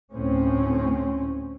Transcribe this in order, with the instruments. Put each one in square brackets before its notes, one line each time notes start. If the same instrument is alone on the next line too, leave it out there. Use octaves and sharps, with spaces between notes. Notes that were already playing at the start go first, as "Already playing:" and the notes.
[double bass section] D2 A2 C4 C#4